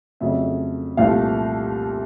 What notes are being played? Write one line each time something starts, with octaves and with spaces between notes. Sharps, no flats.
F2 C#3 F#3 A3 E5
C2 A#2 F3 A3 F5